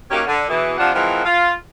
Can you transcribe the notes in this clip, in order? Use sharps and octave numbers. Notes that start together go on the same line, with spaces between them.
F#3 A#3 C#4 D#4 G4
D3
B2 E3 G#4
C3 F3 D4 F4 F#5
E3 F3 G#3 C4 A#4 F#5
F4